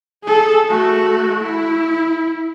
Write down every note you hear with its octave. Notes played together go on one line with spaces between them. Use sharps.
G#4 A4
A3 F#4
E4